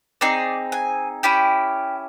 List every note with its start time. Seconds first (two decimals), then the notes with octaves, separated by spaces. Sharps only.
0.21 C4 D#4 G#4 D5
0.72 G#5
1.23 C#4 E4 G4 G5